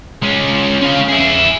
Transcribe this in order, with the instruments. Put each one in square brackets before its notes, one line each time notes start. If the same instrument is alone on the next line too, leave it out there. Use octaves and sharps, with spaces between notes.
[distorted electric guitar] G#3 C#4
C#4 F5
E4 G#4